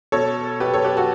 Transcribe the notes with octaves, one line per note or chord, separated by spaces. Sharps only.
B2 A4 C#5
B2 G4 B4
A4 C#5
G4 B4
F#4 A4